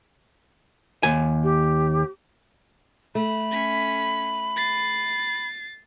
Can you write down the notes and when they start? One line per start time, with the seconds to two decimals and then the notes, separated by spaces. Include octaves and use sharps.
1.03 D#2 G#5
1.44 G4
3.15 A3 B5
3.51 C#4 B6
4.56 A6 C7